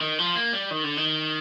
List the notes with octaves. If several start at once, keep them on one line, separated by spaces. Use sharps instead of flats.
D#3
F3
A#3
G3
D#3
D3
D#3